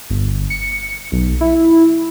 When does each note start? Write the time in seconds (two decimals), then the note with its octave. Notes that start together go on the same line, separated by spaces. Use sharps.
0.10 G1
0.50 C#7
1.12 B1
1.41 E4